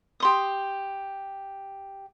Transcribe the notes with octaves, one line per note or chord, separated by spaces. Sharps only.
G4 C6 D#6